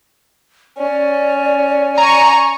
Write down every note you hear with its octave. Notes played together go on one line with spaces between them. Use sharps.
C#4 D5
G#5 A#5 C#6